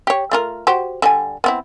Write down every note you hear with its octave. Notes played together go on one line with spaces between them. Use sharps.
G4 C#5
A3 F4 A#4
F#4 G4 C5
D3 G3 G#5
B3 C4 E4